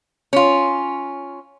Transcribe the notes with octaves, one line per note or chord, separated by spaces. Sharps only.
C#4 F4